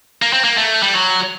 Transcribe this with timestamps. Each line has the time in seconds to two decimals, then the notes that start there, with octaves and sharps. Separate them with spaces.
0.22 A#3
0.33 C4
0.44 A#3
0.57 A3
0.83 G3
0.94 F#3